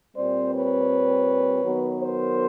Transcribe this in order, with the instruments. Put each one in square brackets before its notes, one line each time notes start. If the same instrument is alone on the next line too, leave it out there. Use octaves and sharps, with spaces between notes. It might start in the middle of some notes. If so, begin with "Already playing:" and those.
[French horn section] A#2 G3 C4 C5 D5
B4 C#5
D#3 F#3 B3
A#4 C5